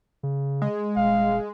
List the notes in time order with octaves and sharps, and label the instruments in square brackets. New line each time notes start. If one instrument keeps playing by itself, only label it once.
[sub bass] C#3
[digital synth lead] G#3
[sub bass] D#1 [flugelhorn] F5